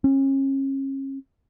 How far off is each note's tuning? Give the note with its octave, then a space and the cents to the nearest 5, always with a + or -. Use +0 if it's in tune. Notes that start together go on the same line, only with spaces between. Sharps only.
C#4 -35